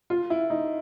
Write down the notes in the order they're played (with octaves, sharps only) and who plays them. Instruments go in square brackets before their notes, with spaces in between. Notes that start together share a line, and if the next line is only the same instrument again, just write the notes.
[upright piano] F4
E4
D#4